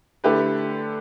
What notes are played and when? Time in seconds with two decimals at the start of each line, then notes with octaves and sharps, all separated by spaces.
0.24 D3 A3 E4 G4 B4